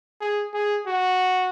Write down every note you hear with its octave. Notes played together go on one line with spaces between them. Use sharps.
G#4
G#4
F#4